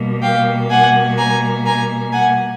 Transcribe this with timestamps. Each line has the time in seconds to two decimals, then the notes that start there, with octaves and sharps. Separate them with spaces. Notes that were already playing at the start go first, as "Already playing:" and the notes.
Already playing: B2 G3 A#3
0.23 F5 G5
0.70 F#5 G#5
1.18 G#5 A#5
1.66 G#5 A#5
2.13 F#5 G#5